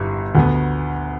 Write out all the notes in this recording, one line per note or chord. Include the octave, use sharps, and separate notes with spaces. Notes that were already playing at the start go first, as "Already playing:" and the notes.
Already playing: G1 G2 G3 E4
D2 D3 B3